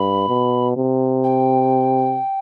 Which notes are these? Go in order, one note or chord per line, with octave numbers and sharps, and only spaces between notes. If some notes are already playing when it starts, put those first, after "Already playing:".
Already playing: G2 B5
B2
C3
G5